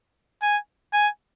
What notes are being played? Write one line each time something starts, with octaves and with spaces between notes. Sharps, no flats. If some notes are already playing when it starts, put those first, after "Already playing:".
G#5
G#5